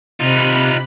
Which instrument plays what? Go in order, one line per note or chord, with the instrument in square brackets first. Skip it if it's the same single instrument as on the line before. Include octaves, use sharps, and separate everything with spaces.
[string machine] C3 B5 F#6 [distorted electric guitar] D#4 F4